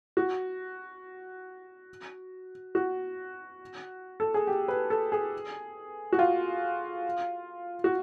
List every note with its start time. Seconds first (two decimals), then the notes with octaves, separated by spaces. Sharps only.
0.17 F#4
2.75 F#4
4.20 A4
4.34 G#4
4.47 G4
4.68 B4
4.90 A4
5.12 G#4
6.13 F#4
6.19 F4
7.84 F#4